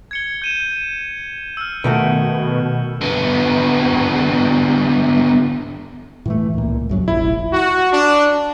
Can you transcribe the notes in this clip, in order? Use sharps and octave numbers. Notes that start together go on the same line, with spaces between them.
G#6 C#7 G7
G6 D#7 E7
E6 F6
B2 D#3 A3 F#4
D3 B3
A2 E3 A3
C#2 A#2
A#1 F#2 F#3
F1 A#1 E4
F#4
D4